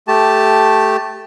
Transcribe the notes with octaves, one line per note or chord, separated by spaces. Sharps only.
A3 G4 A5